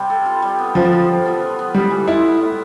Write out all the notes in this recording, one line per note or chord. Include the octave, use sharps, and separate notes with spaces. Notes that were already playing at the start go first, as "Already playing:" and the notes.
Already playing: C3 G3 C4
A4
F4
G3
B3
F3 A4
F4
G3
B3
F4
B3
A2 G3
E3
E4 F4
B3
A2